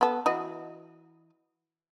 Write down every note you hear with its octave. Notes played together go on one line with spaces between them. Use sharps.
B3 A4
E3 F#4 D#5